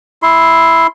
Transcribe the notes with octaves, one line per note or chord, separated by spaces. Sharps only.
E4 C6